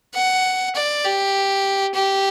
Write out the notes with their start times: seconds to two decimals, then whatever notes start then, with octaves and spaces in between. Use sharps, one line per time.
0.15 F#5
0.75 D5
1.05 G4
1.95 G4